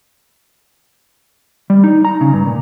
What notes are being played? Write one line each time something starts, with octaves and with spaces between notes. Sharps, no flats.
G3
D#4
A#5
C#3
G2
A#2